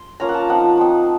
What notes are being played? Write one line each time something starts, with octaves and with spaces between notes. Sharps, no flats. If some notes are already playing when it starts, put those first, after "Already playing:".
Already playing: C6
A#3 C#4 F4 A#5
F#5
A5
F3 C4 D#4 F#5
F3 C4 D#4